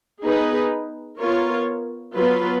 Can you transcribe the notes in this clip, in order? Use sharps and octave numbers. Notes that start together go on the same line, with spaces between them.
B3 D#4 G#4 B4
B3 F4 A#4 C#5
F#3 B3 F4 B4